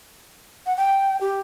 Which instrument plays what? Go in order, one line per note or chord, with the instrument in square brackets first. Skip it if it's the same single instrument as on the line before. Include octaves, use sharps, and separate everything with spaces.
[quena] F#5
G5
G4